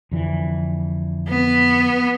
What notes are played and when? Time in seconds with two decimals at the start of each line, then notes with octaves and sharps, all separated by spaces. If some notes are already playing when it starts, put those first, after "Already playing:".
0.12 F2 D3 E3
1.28 B3